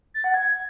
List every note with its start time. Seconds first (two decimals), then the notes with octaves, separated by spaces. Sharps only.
0.14 A6
0.24 F#5
0.34 G#6